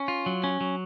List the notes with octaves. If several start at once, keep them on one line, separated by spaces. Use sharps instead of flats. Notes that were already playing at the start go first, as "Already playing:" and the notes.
Already playing: C#4
F4
F#3
C#4
F#3